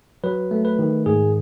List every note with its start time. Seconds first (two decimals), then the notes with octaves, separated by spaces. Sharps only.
0.24 F#3 B4
0.51 A3
0.65 B4
0.79 D#3
1.06 G#2 G#4